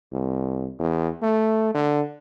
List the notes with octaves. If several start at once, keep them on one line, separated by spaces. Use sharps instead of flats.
C2
E2
A3
D3